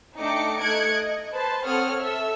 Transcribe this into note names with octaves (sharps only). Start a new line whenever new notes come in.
A3 D4 D#4 G5 D6 C#7
A3 D#4 F#6 G#6 C#7 D7
D#5
B4 C5 A5
C4 A4 C#5 F#5 D#6 F6
A4 E5 E6